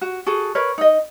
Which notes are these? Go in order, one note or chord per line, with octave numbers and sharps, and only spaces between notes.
F#4
F#4 G#4 A4
A#4 B4 C#5
D#4 D#5